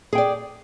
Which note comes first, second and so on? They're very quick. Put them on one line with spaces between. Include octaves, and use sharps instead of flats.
G#4 G5 D5